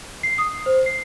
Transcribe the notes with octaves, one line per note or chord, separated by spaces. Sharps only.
C7
D#6
C5
C7